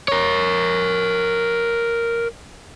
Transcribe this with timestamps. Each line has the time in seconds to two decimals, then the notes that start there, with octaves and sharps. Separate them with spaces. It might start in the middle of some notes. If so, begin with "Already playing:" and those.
0.08 A#4 C#5